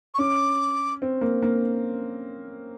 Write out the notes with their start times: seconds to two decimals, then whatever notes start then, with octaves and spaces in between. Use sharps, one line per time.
0.14 C#6
0.18 C#4 D6
1.02 C4
1.21 A#3
1.43 A#3